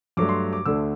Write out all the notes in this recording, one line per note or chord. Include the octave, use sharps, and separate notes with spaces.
G2 F#3 A3 D6
C6
D6
D2 D3 A3 E6